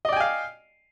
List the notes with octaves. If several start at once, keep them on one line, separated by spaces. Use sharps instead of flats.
D5 D#5 F5 G5 G#5